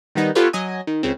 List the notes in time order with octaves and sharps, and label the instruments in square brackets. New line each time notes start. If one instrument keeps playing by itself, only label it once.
[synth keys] D#3 G3 B3 D#4
B3 F4 G4 A4 B4 C#5
F#3 D#5 G#5
D#3
C#2 C#3 C4